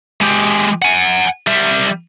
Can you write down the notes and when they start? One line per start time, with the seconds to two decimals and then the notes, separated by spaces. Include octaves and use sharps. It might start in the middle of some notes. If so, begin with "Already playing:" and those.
0.21 G#3 G4
0.82 F#5 G#5
1.47 G3 E5